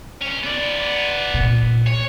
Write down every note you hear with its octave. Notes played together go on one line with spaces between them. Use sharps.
C#2 C#4
B3 D5
A#2
C#5